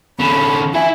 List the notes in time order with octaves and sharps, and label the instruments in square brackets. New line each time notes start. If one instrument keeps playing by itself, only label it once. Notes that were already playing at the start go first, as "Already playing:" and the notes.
[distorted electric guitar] D3 C#4 [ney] B5
[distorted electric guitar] E4 E5 [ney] G#5